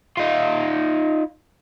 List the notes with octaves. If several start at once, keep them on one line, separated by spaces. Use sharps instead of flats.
D#4 F4